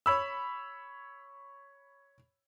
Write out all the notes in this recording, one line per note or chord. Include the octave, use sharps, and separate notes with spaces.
C#5 B5 E6